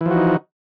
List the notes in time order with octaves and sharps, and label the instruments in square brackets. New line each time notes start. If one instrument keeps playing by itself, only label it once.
[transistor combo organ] E3
F3
F#4
D#4